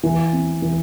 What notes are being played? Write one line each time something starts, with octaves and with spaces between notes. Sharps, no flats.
E3
C4
E3